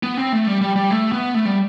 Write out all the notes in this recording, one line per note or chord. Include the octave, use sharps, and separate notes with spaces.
B3
C4
A3
G3
G3
G3
A3
B3
A3
G3